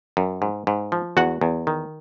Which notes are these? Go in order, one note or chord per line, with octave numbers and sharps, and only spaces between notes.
F#2
G#2
G#2
F3
E2 F#4 F#5
E2
D#3